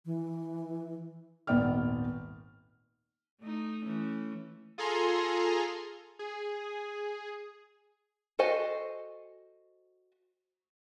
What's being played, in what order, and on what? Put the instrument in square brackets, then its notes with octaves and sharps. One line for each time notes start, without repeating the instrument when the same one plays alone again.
[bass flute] E3
[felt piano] D#1 G#1 B3 D5 G5 F6
[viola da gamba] A3 D#4
E3 A3 C#4
[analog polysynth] F4 G#4 A4 G#5 A#5 C6
G#4
[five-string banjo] F#4 A4 C5 D#5 G#5